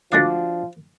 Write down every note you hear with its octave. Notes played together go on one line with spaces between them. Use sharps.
D2 F3 G#3 D4 F#4 F5